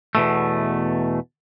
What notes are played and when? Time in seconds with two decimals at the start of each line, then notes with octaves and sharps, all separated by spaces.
0.15 E2 B2 A3